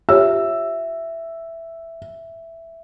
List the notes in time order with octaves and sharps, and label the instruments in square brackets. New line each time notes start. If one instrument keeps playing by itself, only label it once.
[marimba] F4 G4 C#5 [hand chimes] E5 [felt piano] E6